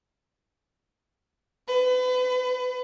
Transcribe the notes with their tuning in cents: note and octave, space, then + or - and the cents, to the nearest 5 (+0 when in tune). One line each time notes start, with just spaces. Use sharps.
B4 +35